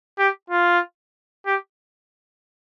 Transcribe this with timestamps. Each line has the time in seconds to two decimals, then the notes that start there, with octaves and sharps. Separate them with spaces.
0.19 G4
0.50 F4
1.46 G4